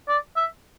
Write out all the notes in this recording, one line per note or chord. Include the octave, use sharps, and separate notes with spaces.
D5
E5